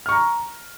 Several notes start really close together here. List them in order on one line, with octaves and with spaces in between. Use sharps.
F6 C#6 A#5